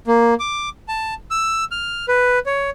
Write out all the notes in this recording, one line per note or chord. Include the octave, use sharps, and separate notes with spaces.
A#3
D6
A5
E6
F6
B4
C#5